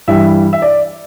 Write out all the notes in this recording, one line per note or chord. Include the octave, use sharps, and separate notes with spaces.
G2 E3 G3 E5
E5
D5